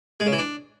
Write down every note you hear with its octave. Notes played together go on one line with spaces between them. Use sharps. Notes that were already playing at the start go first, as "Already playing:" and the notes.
G#3
C#3
E3
D4